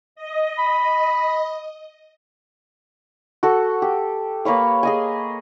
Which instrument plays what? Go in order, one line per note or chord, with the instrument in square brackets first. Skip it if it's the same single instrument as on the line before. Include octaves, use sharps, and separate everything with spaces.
[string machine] D#5
[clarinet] B5
[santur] F#4 A4
G4
A#3 B4 C#5 F5
G#4 D#5 G#5